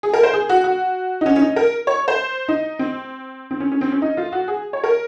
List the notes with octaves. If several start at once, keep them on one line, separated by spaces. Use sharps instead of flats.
G#4
A#4
C5
G#4
F#4
F#4
D#4
C#4
C#4
D#4
A#4
C#5
C5
D#4
C4
C4
C#4
C#4
C4
C#4
D#4
F4
F#4
G#4
C#5
A#4